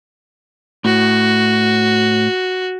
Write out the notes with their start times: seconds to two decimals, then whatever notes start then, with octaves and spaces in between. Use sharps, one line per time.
0.85 A2 F#4